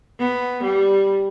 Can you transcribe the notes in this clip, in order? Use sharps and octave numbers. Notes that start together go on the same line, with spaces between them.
B3
G3